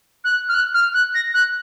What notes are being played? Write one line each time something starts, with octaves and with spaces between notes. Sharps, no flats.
F#6
F6
F#6
F6
F#6
A#6
F#6